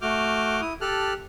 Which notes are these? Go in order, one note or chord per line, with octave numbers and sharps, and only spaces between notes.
A3 F#4 D6 F6 G6
E4 D#6
G4 A4 A5 F6 F#6